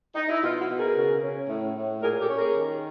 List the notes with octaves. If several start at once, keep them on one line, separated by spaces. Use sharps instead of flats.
D#4
E4
B2 D#4 F4
E4 F#4
B2
G#4 A#4
C#3
C#4
A2
A2
A#2 G#4 A#4
G4 A4
C#4
G#4 A#4
D#3